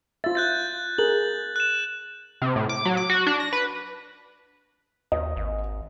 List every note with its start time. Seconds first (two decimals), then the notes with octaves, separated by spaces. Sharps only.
0.24 F4 E5 A6
0.35 F#6 G6 A6
0.98 G#4 A#4 F#7
1.56 F#6 E7
2.42 C3
2.56 A2
2.69 D6
2.85 F#3
2.97 D6
3.10 F#4
3.27 D4
3.40 A#6
3.53 B4
5.12 D#2 D#5
5.37 G#1